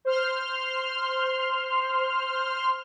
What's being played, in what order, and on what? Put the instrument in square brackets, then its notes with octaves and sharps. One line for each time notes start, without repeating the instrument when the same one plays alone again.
[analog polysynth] C5 C6 F6